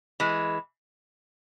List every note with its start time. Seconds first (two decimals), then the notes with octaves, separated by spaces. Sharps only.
0.20 E3 G#3